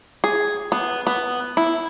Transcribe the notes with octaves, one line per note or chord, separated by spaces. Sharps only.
G#4
B3
B3
E4